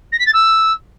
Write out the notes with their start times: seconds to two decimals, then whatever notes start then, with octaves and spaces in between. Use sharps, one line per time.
0.12 A#6
0.19 B6
0.26 A6
0.33 E6